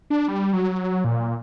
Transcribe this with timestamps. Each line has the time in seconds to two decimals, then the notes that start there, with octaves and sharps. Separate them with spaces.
0.10 D4
0.28 G3
0.53 F#3
1.04 A#2